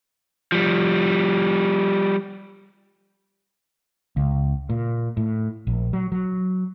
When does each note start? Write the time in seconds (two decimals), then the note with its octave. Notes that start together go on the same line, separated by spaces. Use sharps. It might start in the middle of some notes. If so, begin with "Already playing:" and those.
0.52 F3 G3
4.17 C#2
4.70 A#2
5.17 A2
5.67 A#1
5.93 F#3
6.12 F#3